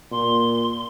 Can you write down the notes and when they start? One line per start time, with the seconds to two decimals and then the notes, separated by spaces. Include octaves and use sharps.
0.11 A#2 C6